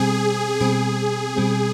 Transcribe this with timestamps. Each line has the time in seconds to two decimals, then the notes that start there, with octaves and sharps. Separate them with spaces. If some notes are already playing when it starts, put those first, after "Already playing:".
Already playing: B2 G3 C4 G#4
0.60 B2 G3 C4 G#4
1.36 B2 G3 C4